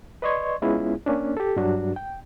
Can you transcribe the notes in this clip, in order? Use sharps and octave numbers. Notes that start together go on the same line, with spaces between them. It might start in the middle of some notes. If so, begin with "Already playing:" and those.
B4 D5 D#5 C6 C#6 G#6
G#3 B3 C#4 E4 F4 G#4
A#3 C#4 D4
G4 A4
G2 F#3 D4 F#4
G5